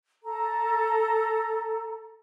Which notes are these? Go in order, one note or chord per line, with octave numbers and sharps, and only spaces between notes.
A4 A#5